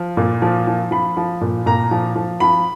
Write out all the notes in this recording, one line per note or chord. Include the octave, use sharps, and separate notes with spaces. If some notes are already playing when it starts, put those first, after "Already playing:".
Already playing: F3
A#2
F3
F3
F3 B5
F3
A#2
A#2 A#5
F3
F3
F3 B5